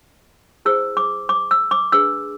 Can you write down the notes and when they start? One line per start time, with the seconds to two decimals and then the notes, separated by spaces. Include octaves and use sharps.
0.65 E4 G#4 C5 E6
0.97 D6
1.29 D6
1.51 E6
1.71 D6
1.92 D4 G#4 B4 E6